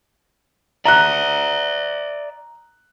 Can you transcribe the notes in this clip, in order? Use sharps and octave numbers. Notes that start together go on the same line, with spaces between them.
D5 E5 A#5 F#6